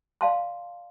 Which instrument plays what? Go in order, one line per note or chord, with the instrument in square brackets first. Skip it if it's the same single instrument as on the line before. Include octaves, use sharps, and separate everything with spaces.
[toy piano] D5 F5 A5 C6